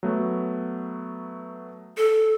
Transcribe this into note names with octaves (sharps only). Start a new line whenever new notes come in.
F#3 A3 B3
A4